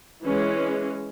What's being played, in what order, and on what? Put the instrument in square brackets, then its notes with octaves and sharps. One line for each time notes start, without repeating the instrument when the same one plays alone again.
[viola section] E3 G#3 C#4